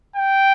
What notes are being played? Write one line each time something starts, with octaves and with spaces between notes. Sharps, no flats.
G5